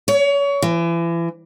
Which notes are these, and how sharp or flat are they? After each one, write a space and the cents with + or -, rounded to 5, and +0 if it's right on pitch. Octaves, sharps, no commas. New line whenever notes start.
C#5 +30
E3 +35